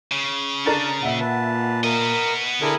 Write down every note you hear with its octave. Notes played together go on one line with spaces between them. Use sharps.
C#3
D4 A#4 A#5 A6
A#2 E5 F#5
B4 A5
B3 A#4 D#5
D3 E4 G#4 A#4